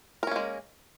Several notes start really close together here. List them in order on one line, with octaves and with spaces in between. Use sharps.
A#4 C#4 A#3 G#3